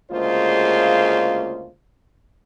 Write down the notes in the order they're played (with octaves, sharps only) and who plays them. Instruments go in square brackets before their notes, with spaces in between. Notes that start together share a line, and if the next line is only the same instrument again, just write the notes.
[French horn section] D2 C#3 G#3 A#3 F4 C5